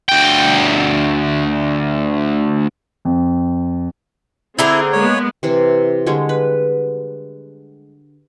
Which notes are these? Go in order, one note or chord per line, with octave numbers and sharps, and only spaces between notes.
D2 G5
F2
D3 C4 E4 G#4 A#5
G#3 A#3 B3 C#5
C3 E3 E4
D3 G3 G#3 C#5
B4